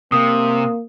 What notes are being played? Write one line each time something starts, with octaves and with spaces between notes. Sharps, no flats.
C3 A#3 D#6